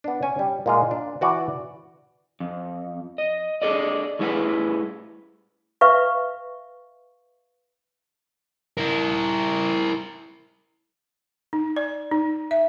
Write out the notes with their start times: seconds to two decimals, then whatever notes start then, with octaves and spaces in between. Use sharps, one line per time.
0.04 B3 D4
0.23 C#4 G#5
0.39 G3
0.66 A#2 G#3 F4
0.91 D4
1.21 E3 F#4 D5
2.40 F2
3.18 D#5
3.62 D4 G#4 A4 D5 D#5
4.19 A2 G3 E4 G#4 B4 F#5
5.81 B4 E5 F5 C#6
8.77 E4 A#4
11.53 D#4
11.76 D5
12.11 D#4
12.51 E5